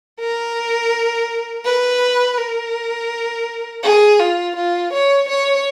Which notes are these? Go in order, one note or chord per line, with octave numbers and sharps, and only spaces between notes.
A#4
B4
A#4
G#4
F4
F4
C#5
C#5